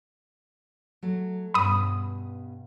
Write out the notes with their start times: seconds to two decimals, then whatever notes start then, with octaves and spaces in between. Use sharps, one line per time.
1.03 F#3 A3
1.54 G2 B2 C#4 B5 D#6